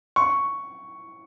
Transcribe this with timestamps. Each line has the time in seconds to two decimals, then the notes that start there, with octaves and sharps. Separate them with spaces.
0.16 C#6